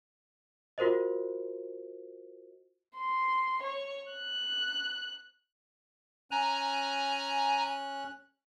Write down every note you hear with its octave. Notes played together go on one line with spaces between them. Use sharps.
F4 F#4 A#4 C5 D#5
C6
C#5
F#6
C#4 G#5 A#5 F#6